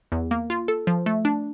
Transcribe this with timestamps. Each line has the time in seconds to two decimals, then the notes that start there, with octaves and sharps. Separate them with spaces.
0.12 E2
0.31 A#3
0.50 F4
0.68 A4
0.87 F3
1.06 A3
1.25 D4